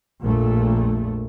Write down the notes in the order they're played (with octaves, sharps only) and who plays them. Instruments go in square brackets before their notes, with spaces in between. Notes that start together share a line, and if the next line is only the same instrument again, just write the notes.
[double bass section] A#1 F2 A#2 A3